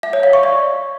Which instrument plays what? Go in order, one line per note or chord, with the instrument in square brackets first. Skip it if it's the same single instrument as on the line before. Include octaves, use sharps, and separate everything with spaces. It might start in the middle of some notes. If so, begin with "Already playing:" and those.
[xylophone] E5
C#5
F5
C#6
D5